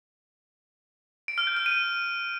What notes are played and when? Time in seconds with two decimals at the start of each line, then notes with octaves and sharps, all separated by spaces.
1.28 D7
1.38 F6
1.47 G6
1.57 F6
1.66 D#7